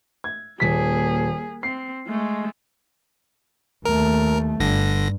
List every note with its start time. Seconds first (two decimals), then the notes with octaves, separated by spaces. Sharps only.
0.24 G#6
0.60 D#1 A#3 G#4 B6
1.63 C4 C7
2.07 G#3 A3
3.85 D#2 A3 A#4
4.60 G1 G2 D3 A#6